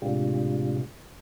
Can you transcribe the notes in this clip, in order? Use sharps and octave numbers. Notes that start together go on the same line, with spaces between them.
A2 C3 G#3 D4 F4 G4